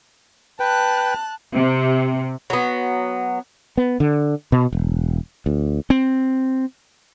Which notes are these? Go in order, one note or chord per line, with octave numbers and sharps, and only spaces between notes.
B4 G5 A5 F#6
C3
F#3 B3
B3
D3
B2
E1
D2
C4